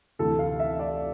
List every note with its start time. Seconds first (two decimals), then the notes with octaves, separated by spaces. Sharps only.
0.19 D2 C3 E3 A4
0.39 F5
0.60 E5
0.79 D5